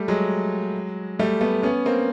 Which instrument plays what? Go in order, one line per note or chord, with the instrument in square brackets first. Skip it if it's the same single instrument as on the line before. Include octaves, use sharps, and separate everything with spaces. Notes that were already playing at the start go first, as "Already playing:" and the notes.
Already playing: [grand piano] G3 A3
F#3 G#3
G3 A3
A3 B3
B3 C#4
A#3 C4